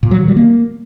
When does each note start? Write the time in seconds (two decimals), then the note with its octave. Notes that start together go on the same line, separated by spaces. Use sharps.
0.03 A#2
0.11 F#3
0.20 D#3
0.28 G3
0.36 A#3